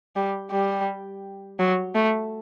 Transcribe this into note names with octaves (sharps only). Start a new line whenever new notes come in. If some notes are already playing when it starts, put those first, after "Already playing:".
G3
G3
F#3
A3